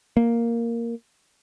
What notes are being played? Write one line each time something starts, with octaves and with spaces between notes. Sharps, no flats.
A#3